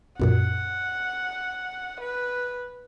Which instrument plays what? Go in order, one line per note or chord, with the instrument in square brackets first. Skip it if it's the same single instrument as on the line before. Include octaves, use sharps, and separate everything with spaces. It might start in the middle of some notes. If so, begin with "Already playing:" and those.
[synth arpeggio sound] B1 F#2 A#2 [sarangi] F#5
[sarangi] B4